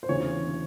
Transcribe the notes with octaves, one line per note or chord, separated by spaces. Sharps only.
C5
E1 D2 C#3 E3 C#5